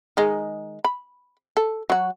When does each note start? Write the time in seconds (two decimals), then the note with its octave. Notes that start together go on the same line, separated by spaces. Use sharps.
0.17 D#3 G#3 D#4
0.84 B5
1.57 A4
1.90 F#3 F#4